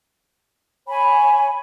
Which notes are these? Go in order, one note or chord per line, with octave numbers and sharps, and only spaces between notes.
C#5 G#5 B5